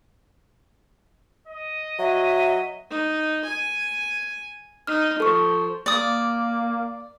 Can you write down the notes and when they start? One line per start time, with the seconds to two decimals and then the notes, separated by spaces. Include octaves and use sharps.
1.47 D#5
1.99 F#3 E5
2.90 D#4
3.46 G#5
4.87 D#4 F6
5.20 F3 A4 C#6
5.86 A#3 D5 D#6